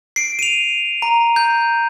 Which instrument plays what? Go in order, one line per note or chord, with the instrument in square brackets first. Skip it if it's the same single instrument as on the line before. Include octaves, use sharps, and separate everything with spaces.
[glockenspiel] C7 D7
D#7 F7
A#5
G6